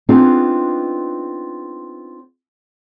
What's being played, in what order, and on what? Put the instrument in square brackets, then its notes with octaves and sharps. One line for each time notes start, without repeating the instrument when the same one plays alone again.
[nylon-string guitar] B3 C4 D4 D#4 F4 G#4